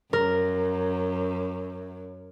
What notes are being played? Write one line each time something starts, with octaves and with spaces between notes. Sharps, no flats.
F#2 A#4